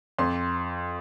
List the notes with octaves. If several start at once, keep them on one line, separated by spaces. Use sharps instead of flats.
F2 C6